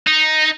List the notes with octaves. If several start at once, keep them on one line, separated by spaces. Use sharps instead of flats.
D#4